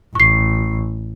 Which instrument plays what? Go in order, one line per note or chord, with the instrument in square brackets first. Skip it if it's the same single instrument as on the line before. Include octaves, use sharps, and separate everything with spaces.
[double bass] A1 [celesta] C#6 C7